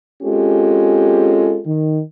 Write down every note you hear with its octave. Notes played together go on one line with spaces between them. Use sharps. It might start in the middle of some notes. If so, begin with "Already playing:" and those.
G#3 C4 C#4 F4 G4 A4
D#3